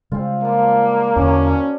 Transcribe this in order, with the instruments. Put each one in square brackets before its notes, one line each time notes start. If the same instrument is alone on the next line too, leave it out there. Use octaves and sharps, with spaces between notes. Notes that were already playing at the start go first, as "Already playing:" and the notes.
[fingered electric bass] C#3 G3 G#3 [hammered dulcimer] C4 F4
[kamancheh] A#3 [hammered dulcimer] D4 F4
[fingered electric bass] E2 D3 [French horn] C#4 [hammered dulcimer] D4 F#4 E5